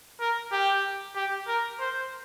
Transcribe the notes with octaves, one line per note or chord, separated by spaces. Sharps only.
A#4
G4
G4
A#4
C5